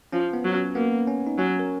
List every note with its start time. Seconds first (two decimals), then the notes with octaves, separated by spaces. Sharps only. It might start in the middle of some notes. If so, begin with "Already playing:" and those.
0.12 F3 C#4
0.33 B3
0.44 F#3
0.55 C#4
0.75 A#3 B3
1.07 C#4
1.27 D#4
1.38 F#3 C#4
1.59 A#4